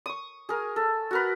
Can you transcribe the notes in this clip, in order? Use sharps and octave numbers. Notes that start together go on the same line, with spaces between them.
C#6 D#6
G#4 A#4
A4
F#4 A#4 B4